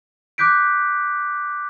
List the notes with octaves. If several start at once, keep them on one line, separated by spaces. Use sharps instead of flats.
D6 F#6 G6 B6 D7